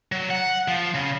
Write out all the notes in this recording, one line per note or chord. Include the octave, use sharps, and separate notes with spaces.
F#3
F#5
F3
C#3